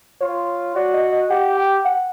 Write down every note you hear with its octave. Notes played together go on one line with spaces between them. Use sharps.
F4 C#5
F#4 D5
D#5
D#5
G4 F#5
G5
F#5